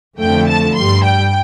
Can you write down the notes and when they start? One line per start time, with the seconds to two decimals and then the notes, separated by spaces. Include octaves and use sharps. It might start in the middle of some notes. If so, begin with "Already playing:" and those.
0.18 F2 D3 F3 A3 G5
0.46 A5
0.75 G2 G3 C6
1.03 G5